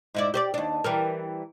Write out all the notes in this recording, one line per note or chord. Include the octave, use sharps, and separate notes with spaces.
G#2 E4 D5
G4 C5 D5
D#2 D4
E3 G3 A#4